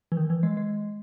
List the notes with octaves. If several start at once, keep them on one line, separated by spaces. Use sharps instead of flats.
E3
D#3
E3
G#3
G#3